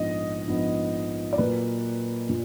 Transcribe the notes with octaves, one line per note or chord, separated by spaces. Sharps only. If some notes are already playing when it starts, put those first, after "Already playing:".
Already playing: A#1 G#2 F3 B3 D#5
A#1 G#2 F3 B3
D5
A#2 F#3 A#3 B4
A#2